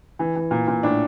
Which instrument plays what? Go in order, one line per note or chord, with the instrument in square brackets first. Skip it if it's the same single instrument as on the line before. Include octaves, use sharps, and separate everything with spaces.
[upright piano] E3
E3
A#2
A#2
A2 D4